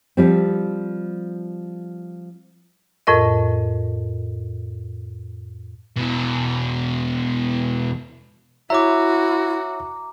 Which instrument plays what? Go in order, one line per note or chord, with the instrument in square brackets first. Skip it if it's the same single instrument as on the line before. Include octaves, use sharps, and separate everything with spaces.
[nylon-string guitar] F3 G3 C4
[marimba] F2 A2 A#4 D#5
[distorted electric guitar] E2 B2
[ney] E4 [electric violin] F#4 [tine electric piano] C#5 E5 [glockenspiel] A#5 D6